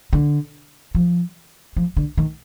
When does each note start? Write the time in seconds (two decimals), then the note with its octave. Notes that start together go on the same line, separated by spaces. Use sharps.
0.13 D3
0.95 F3
1.76 F3
1.97 D3
2.17 D#3